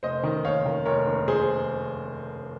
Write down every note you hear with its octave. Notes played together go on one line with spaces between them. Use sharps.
F1 C5 D#5
D#3
D#2 C#5 F5
D#3
F1 A#4 C#5
D#2
G#4 C5